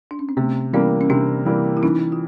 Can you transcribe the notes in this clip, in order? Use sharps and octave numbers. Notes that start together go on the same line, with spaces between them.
D4
C#4
C4
C3 A3 B3
E3 G3 A#3 B3 C#4
C#4
C3 C4 D4
E3 G3 A#3
E4
E3 C#4 D#4
F4